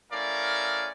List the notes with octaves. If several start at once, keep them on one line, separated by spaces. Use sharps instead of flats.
A3 C#4 E4 A#4 D5 F5